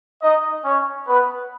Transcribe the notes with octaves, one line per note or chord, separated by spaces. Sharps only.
D#4 D#5
C#4 C#5
B3 B4